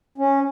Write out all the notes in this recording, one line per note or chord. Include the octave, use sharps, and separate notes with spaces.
C#4